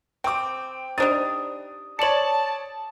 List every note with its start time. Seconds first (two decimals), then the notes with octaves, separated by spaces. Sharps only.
0.24 C4 G5 D6
0.98 G3 D4 D#4 C5 D#6 A6
1.99 C#5 D5 A5 C#7 F#7